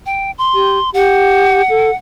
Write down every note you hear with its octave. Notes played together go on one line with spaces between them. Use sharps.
G5
C6
G4
G4 F#5
A4